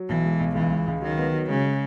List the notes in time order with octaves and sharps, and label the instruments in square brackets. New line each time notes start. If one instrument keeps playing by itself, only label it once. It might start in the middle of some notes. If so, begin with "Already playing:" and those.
Already playing: [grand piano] F#3
[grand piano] B1 [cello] E3
[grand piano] G#3
B1
[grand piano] C#2 [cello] E3
[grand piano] G#3
C#2
[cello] D#3 [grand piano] F#3
[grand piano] B3
F#3
[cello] C#3 [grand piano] G#3
[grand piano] G#3